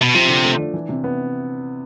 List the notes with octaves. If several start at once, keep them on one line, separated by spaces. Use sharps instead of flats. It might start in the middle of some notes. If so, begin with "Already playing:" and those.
B2
C3 F3
D3
A3
D4
E3
C3
B3